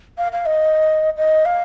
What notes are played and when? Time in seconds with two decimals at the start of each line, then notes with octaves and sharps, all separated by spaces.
0.18 F5
0.32 F5
0.46 D#5
1.17 D#5
1.45 F5